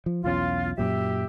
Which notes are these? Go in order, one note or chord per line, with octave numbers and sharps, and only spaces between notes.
F3
B1 E2 C#4 F4
F#2 A#2 F#3 G4 E5